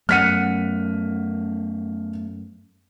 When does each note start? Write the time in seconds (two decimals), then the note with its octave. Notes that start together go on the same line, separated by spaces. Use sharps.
0.09 F#2 A3 B3 F#5 F6 B6 D#7